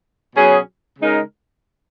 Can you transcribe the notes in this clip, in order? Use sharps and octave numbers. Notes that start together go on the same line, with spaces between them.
B2 F#3 C#4 G#4
C#3 G#3 D#4 A#4